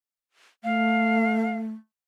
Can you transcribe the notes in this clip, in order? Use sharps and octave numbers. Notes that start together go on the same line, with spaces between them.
A3 F5